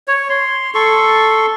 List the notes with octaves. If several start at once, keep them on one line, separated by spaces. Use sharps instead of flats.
C#5
C6
A4 C6 C#6